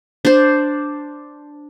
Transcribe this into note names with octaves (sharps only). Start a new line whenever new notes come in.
D4 C5